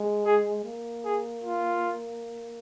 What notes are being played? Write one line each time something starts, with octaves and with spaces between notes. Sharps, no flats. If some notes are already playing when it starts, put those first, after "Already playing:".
Already playing: G#3
G#4
A#3
G#4
F4